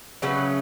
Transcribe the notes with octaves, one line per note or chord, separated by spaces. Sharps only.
C#3 F#3 A3 C#4 B4